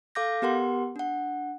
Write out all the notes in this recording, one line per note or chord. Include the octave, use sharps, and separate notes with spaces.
A4 F5 D6 G6 A#6
B3 G4 A#4 F#5 C6
D4 F#5